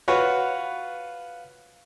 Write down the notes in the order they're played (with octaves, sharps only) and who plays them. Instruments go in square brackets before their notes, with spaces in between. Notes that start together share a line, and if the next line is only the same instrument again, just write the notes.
[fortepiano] F4 F#4 B4 C#5